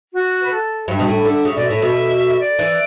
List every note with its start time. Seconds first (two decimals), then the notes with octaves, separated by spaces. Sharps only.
0.12 F#4
0.40 B4
0.50 A4
0.88 G2 E5
0.99 B2
1.07 A2
1.25 D3
1.45 C#3
1.54 B2 D5
1.63 E5
1.70 A2
1.82 B2
2.40 D5
2.59 E3